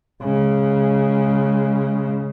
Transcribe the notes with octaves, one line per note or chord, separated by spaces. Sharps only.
C#3 G#3